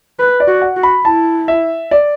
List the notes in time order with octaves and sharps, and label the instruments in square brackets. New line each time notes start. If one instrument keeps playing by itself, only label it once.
[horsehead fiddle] B4
[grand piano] D5
[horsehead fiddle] F#4
[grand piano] F#5
[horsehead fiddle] F#4
[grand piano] B5
[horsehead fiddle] E4 [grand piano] A5
[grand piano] E5
D5